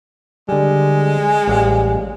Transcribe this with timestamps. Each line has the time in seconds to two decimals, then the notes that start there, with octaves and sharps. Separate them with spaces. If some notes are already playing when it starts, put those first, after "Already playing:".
0.49 D3 G3 G#3
1.48 A1 G3 F5